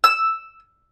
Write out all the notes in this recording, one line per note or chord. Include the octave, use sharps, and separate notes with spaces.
E6